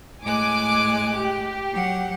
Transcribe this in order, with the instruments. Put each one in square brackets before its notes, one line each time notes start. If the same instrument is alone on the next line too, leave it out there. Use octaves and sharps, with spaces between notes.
[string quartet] A2 G#3 F#6 [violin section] G#5 D6
[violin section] G4
[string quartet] F#3 F#5